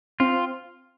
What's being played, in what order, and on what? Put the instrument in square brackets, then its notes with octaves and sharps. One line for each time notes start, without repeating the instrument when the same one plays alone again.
[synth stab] C4 [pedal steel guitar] F4